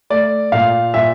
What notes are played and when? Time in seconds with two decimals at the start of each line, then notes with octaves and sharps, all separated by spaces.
0.10 A3 D5
0.52 A#2 F5
0.94 A#2 E5